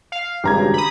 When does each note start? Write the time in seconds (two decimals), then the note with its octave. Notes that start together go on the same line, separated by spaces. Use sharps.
0.12 F5
0.44 G#1 G2 C#3 G4 A#5 G#6
0.74 B5 D#6